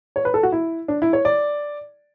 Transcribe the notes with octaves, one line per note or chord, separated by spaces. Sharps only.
C#5
B4
A4
F#4
E4
D4
E4
C#5
D5